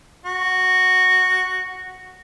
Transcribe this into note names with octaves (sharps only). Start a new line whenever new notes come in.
F#4